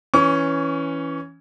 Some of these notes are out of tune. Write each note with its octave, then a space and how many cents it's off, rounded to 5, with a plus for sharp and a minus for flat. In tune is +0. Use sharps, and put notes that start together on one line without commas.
E3 +0 C#4 +0 C#6 +40